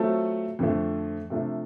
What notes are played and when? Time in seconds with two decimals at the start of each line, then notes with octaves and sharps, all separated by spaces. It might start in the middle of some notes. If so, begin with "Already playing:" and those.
Already playing: F#3 A3 C4 F4 A4
0.59 F2 D3 F3 A3
1.30 C3 F3 A3 D4